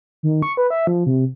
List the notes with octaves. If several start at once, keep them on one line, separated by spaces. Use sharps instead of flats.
D#3
C#6
B4
E5
F3
C3